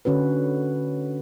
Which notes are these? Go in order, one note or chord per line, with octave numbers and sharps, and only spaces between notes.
D3 C#4 F#4 B4